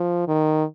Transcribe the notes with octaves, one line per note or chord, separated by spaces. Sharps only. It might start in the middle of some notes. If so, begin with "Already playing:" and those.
Already playing: F3
D#3